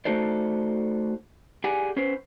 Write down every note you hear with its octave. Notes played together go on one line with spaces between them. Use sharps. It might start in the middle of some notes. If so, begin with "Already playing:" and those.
A3 D#4 F#4 A4 C5 D5
G4 G#4 D5 F#5 G#5
C#4 B4 C5